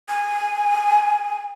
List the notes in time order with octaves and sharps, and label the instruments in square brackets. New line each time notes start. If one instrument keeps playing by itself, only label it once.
[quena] G#5